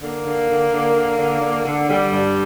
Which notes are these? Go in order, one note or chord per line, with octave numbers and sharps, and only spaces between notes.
D3 A#3
D3
D3
D3
D3
D3
D3
D3
D3 G3
G2